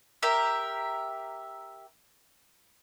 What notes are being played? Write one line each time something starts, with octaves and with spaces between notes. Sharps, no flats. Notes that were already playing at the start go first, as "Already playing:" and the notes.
G4 A#4 E5